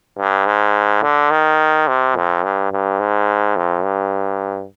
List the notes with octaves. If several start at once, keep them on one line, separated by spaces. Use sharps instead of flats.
G2
G#2
D3
D#3
C3
F2
G2
G2
G#2
F2
G2